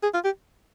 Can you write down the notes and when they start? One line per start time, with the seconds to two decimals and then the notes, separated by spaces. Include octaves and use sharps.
0.03 G#4
0.14 F4
0.24 G4